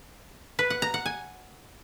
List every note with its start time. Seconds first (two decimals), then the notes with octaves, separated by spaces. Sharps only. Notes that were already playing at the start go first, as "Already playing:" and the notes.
0.59 B4
0.70 F#5
0.82 A#5
0.94 F#5
1.06 G#5